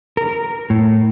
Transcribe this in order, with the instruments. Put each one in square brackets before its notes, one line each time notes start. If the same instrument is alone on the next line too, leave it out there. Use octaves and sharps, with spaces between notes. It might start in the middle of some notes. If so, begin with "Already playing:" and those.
[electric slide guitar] A#4
A2